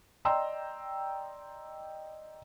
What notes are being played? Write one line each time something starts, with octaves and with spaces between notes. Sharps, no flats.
D5 D#5 G5 A#5 C6 E6